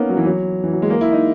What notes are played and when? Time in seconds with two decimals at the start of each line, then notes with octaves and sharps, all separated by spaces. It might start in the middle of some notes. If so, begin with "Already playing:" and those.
Already playing: A#3 B3 C#4 D#4
0.09 F#3
0.17 E3
0.26 F#3
0.64 E3
0.73 F#3
0.82 G#3
0.90 A#3
1.01 E4
1.12 D#4